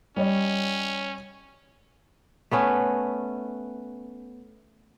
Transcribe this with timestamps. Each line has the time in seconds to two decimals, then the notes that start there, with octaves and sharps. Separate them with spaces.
0.17 G3 C#4 C#5 D#5
2.51 A3 B3 C#4